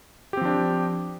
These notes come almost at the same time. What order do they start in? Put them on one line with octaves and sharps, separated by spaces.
G4 C4 F3 D4